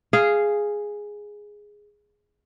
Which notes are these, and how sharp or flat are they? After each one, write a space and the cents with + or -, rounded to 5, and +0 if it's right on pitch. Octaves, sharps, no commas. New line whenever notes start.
G#4 +0 F5 -10